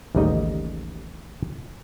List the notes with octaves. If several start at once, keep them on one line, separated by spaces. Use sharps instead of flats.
A1 D#2 C#3 G3 D#4 D#5